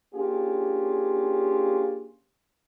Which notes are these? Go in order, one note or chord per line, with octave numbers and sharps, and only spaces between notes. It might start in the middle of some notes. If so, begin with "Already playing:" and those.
A#3 C#4 D4 F4 G4 G#4